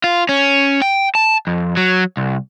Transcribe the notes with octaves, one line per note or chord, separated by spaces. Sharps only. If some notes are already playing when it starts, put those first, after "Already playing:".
F4
C#4
G5
A5
F2
F#3
C2